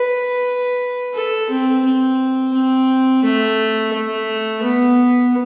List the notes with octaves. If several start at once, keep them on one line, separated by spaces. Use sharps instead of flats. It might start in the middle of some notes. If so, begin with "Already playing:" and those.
Already playing: B4
A4
C4
C4
C4
A3
A3
B3